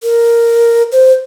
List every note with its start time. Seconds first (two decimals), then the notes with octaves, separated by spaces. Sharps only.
0.03 A#4
0.92 C5